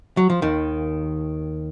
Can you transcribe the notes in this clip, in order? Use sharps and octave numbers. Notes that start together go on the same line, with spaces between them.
F#3
F3
D#2 D#3